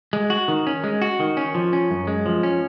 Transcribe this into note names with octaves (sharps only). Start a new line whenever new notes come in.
G#3
F#4
D#3
C#4
G#3
F#4
D#3
C#4
F3
C#4
F#2
G#3
F3
C#4